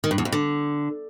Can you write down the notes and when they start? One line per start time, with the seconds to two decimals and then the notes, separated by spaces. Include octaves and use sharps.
0.04 D#3
0.11 G2
0.18 E2
0.25 F2
0.32 D3